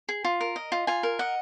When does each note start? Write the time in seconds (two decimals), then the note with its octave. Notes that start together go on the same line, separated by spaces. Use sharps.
0.09 G#4
0.24 F4
0.40 A#4
0.56 D#5
0.72 F4
0.87 F4 G#5
1.03 A#4
1.19 D#5 F#5